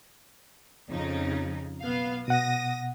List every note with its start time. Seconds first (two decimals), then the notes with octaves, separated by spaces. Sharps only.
0.89 F2 C#3 D#4
1.82 B1 B3 F5
2.28 B2 F#5 D#6 A#6